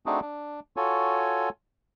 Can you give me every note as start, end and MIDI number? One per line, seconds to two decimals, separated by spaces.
0.06 0.20 57
0.06 0.20 60
0.06 0.20 62
0.06 0.20 63
0.06 0.20 66
0.06 0.20 68
0.22 0.60 62
0.77 1.49 65
0.77 1.49 66
0.77 1.49 69
0.77 1.49 73
0.77 1.49 80